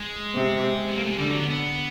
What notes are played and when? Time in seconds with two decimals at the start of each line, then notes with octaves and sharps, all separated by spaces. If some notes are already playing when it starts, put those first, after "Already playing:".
Already playing: G#3
0.35 C3
0.89 B3
0.96 A#3
1.04 A3
1.11 G#3
1.18 D3 G3
1.29 F#3
1.39 B3
1.50 B3